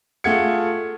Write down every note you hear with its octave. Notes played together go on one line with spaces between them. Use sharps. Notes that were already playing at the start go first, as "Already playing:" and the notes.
A3 F4 G#4 F#5 G#6 C#7